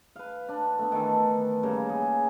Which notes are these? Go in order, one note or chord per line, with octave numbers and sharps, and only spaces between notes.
B4 F5
D4
A3 B3
D#3 E3 A4
C#3 G3 A#3
G#4